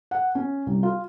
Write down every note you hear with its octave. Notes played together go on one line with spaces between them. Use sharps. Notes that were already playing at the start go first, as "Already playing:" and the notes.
F#5
C#4
C2
F4